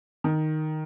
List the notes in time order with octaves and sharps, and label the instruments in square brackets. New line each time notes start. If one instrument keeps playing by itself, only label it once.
[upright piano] D#3